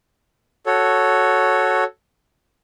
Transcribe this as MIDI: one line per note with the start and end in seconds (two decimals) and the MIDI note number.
0.66 1.84 66
0.66 1.84 69
0.66 1.84 73